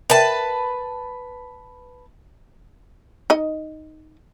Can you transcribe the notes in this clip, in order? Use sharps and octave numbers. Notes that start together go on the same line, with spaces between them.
A#4 B4 E5 G5 A5
D#4 D#5